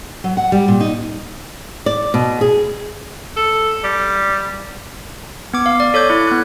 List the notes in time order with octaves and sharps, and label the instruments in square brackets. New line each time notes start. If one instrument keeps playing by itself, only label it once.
[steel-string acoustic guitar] F#3
F#5
G3
A#2
D#4
[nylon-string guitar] D5
B2
G#4
[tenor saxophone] A4
G3
[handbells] B3 D6
F5
D5
A4 C#5 D6 G6
E4
B3 F#6